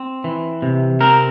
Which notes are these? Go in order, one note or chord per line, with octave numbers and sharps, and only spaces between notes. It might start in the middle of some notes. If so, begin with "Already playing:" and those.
Already playing: C4
E3
C3
C4 A#4